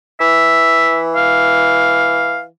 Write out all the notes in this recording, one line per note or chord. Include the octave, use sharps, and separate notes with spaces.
E3 E5
F5